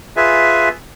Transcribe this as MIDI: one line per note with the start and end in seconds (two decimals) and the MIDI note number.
0.17 0.69 65
0.17 0.69 68
0.17 0.69 71
0.17 0.69 76
0.17 0.69 80